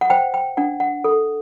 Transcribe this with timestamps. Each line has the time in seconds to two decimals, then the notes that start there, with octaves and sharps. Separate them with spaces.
0.01 F#5
0.10 C5 G5
0.34 G5
0.57 D4 F#5
0.80 F#5
1.04 A4